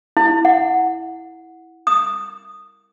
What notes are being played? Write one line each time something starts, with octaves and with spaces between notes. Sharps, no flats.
E4
F#5
D#6